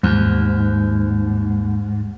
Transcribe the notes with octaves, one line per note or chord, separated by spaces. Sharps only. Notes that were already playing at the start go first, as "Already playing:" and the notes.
D#2 G#2